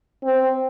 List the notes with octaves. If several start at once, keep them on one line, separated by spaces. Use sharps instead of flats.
C4